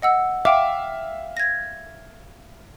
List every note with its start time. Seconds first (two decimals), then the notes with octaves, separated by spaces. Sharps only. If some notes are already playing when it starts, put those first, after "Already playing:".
0.02 D#5 F#5 E6
0.45 E5 F5 G5 D6
1.37 G#6 A#6